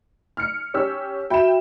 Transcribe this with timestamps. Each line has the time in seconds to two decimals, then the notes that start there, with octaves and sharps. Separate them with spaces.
0.37 F6 C#7
0.74 C#4 G4 E6
1.30 F#4 E5 G5 B5 E7